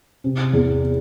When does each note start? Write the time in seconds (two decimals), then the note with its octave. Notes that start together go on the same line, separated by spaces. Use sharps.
0.24 C3
0.53 E2